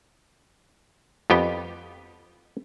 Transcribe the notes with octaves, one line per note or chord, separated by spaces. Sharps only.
F2 B3 G4 G5